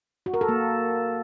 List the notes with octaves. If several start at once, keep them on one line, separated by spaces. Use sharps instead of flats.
F#4
A#4
A4
A#3